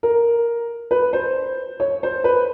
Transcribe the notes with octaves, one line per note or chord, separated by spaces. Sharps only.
A#4
B4
C5
C#5
C5
B4